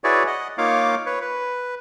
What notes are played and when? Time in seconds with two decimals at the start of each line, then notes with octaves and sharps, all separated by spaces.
0.04 E4 F#4 G#4 B4 C#5 D5
0.27 D#5 F#5
0.58 A#3 D#4 F4 C#5 F5 D6
1.06 B4 C#5
1.21 B4